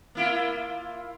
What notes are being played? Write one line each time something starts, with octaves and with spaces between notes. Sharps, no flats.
A#3 E4 F4